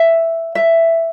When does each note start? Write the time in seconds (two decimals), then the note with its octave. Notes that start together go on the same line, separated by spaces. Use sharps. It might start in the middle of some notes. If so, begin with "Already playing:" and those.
Already playing: E5
0.55 E5